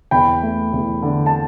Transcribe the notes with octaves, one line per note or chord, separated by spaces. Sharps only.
E2 G5 B5
A3
E2
D3
A5